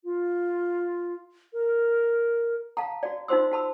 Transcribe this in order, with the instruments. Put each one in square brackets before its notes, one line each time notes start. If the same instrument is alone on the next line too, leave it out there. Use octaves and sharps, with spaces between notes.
[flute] F4
A#4
[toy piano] F5 A5 A#5
F#4 D5
D#4 F4 F#4 C5 C6 E6
F#4 A5 B5 E6